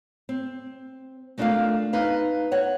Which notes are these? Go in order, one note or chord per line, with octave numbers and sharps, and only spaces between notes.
C4
G#3 A3 D4 F4 A#4 F5
D#4 B4 F5
C#5 F#5